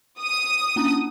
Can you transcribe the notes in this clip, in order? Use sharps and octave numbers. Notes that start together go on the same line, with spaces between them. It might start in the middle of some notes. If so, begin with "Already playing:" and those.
D#6
A#3 C#4 D4